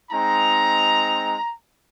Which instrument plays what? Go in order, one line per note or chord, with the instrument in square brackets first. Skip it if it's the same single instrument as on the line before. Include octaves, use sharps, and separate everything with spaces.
[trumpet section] G#3 C4 D#4 A#5